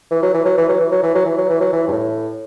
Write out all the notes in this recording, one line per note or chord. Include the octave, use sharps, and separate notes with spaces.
E3
F#3
E3
F#3
E3
F#3
E3
F#3
E3
F#3
E3
F#3
E3
F#3
E3
G2
A2